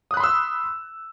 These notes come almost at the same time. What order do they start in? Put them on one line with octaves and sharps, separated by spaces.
D#6 F#6 B5 C6 E6